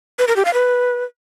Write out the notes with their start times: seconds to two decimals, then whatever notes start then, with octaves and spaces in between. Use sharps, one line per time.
0.19 B4
0.28 A#4
0.36 G4
0.45 F5
0.54 B4